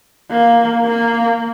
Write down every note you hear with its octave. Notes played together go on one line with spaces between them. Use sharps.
A#3
A#3